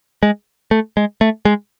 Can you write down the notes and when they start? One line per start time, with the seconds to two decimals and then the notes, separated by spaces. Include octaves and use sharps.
0.23 G#3
0.71 A3
0.97 G#3
1.21 A3
1.45 G#3